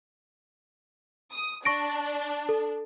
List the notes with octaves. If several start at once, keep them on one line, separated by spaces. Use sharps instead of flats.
D#6
D4 C#6 A#6 D7
A4